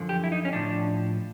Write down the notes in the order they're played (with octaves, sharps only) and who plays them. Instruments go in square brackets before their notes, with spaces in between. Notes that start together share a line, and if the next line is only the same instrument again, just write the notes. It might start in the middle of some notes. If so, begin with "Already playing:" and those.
Already playing: [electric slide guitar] F#2 D3 F3
G4
E4
D#4
C#4
A2 F3 D4